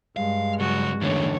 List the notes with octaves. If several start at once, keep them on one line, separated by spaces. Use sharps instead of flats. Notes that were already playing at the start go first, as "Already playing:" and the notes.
G2 G#3 F5
C#3 F#3 F#4
E2 A2 D3 D#3 C#5